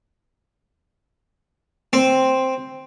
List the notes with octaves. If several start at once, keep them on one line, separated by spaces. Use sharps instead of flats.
C4